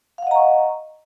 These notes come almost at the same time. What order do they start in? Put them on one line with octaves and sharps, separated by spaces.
F5 F#5 D#5 A#5 C#6